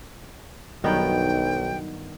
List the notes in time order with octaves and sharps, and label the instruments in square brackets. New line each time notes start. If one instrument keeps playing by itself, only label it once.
[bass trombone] B1 [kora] G2 D#3 B3 [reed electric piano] F#3 D#4 G6 [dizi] G5